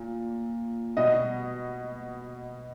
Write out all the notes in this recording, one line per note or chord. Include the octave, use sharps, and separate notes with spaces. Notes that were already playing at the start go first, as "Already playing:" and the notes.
Already playing: A#2
B2 D#5